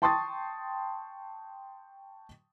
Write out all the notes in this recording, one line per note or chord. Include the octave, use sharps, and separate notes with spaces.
G5 A5 C6 C#6 D#6 A6